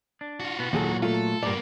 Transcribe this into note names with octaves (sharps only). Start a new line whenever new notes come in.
D4
F4 F#4
B2 B3
D#2 A#2 F#3 G#4 A4
A3 F4 A4
G2 A#2 A#3 B3 D5